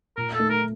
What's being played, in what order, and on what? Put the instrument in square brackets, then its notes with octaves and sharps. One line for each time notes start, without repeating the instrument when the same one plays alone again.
[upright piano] A#2 [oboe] A#4
[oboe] A4
[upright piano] A3
[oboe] A#4